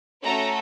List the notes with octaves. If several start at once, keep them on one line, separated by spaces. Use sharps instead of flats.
A3 C#4 F#4 A4 A#5